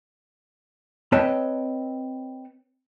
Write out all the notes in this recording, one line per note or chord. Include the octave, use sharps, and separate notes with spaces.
C4 B4 C#5 D#5 G5 A5